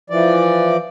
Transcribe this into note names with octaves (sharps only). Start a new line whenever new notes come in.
E3 F3 D5